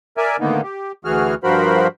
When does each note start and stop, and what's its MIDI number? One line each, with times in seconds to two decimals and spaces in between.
0.17 0.37 70
0.17 0.37 74
0.17 0.37 76
0.17 0.37 80
0.40 0.61 45
0.40 0.61 50
0.40 0.61 51
0.40 0.61 58
0.40 0.61 59
0.40 0.61 63
0.63 0.92 67
1.05 1.35 38
1.05 1.35 52
1.05 1.35 66
1.05 1.35 68
1.05 1.35 89
1.44 1.87 43
1.44 1.87 53
1.44 1.87 66
1.44 1.87 70
1.44 1.87 72
1.44 1.87 83